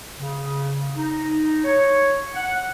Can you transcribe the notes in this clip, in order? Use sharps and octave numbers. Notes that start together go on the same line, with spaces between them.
C#3
D#4
C#5
F#5